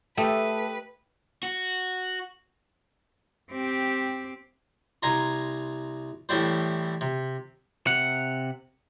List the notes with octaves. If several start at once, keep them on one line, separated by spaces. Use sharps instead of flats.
A3 G4 A4 B4 D#5
F#4
C4 G4
C2 G#5 A#5 C6
A2 E3 G3 C5
C3
C3 F#5